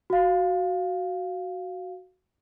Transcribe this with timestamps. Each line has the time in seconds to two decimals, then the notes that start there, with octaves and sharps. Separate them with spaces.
0.10 F#4 F5